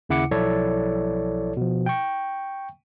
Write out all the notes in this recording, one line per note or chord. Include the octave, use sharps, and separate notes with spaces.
D#2 C#3 E4 F#5 D6 C#7
B1 F3 E4 A4 C#5 D5
B2 F3
G5 C#6